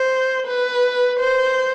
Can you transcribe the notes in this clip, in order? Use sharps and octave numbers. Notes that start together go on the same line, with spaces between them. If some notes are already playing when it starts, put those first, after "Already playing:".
Already playing: C5
B4
C5